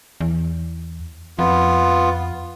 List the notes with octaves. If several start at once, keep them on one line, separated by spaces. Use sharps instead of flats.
E2
F2 B3 F4